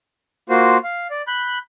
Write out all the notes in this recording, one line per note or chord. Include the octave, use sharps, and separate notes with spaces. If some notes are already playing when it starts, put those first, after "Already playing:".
A#3 F4 F#4 C5
F5
D5
B5 F#6 G6